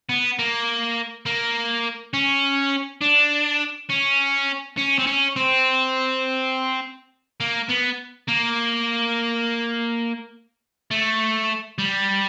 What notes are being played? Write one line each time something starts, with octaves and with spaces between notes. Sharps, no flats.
B3
A#3
A#3
C#4
D4
C#4
C#4
C4
C#4
C4
A#3
B3
A#3
A3
G3